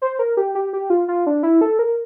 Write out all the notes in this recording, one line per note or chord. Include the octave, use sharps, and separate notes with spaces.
C5
A#4
G4
G4
G4
F4
F4
D4
E4
A4
A#4